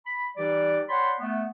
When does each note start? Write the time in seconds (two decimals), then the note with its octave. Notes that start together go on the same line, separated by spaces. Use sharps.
0.07 B5
0.36 E3 G3 D#4 G4 D5
0.88 C#5 D5 F#5 G5 B5 C6
1.20 A3 B3